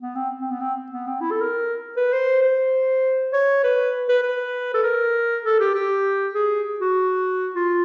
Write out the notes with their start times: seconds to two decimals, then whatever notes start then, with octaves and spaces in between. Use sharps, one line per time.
0.01 B3
0.15 C4
0.40 C4
0.51 B3
0.60 C4
0.92 B3
1.07 C4
1.21 E4
1.31 A4
1.41 A#4
1.97 B4
2.12 C5
2.42 C5
3.33 C#5
3.64 B4
4.09 B4
4.23 B4
4.74 A4
4.84 A#4
5.44 A4
5.60 G4
5.75 G4
6.35 G#4
6.80 F#4
7.55 F4